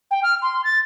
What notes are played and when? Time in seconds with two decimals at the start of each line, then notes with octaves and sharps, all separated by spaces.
0.11 G5
0.23 F6
0.42 C6
0.64 A6